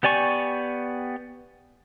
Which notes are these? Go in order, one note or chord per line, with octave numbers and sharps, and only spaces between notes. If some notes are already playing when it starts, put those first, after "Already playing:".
B3 G4 D5 G#5 C#6